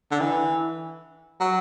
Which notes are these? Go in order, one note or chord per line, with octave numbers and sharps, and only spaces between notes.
D3
E3
F#3